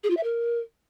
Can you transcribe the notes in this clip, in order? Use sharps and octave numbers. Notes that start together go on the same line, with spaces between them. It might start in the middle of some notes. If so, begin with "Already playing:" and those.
G#4
F4
E5
A#4